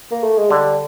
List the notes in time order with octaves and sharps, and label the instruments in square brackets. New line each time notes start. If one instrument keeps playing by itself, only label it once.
[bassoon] A#3
A3
G#3
[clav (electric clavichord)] D3 [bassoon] G3